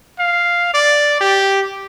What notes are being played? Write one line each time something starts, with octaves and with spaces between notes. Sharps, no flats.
F5
D5
G4